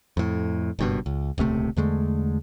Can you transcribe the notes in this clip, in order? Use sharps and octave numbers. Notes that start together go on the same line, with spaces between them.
F2 A2
F#1 G2 B2
C#2
D#1 C#2 C3 A3
E2 D3 G#3 A3